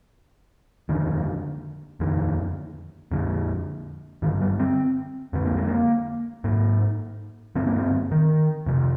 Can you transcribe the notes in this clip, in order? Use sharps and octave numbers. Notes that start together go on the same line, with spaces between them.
F2 D3 D#3
F2 D3 D#3
F2 D3
G2 D3 D#3
G3
C4
F2 D3 C4
A#3
G#3
A#3
G#2 A#3
G2 D3 C4
A#3
C4
D#3
F2 C3